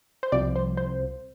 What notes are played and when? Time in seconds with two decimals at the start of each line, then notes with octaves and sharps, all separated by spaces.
0.23 C5
0.32 C2 C3 F3 D5
0.56 C5
0.77 C5